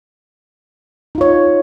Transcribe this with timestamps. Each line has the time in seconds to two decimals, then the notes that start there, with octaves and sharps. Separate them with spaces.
1.15 D#4
1.18 F4
1.21 C#5